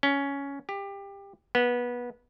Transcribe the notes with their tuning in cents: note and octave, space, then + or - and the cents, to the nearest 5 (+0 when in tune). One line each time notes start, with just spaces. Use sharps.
C#4 +10
G4 +20
B3 -20